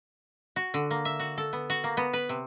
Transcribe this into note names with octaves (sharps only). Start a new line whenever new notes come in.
F#4
D3
A#3
E5
F#4
A4
B3
F#4
A#3
B3
B4
C3